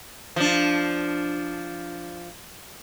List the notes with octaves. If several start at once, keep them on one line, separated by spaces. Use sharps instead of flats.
F3 D4